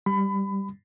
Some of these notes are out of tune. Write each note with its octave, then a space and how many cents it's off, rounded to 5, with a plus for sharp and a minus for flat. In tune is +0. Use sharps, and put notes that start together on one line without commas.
G3 +0 B5 +25